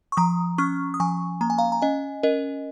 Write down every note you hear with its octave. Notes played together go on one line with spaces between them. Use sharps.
C#6
F3 A#5 D#6
C#4 C#6 F6
D#6
F3 G#5 C#6
A#3 A#5
G#5
F5 A#5
A#5
C#4 D#5 G#5
C#4 A#4 D#5